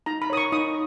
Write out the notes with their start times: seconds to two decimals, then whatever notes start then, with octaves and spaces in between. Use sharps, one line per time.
0.06 D#4 A#5
0.22 B5
0.30 A#4 C#5 D#6
0.37 C#6
0.52 D#4 D#6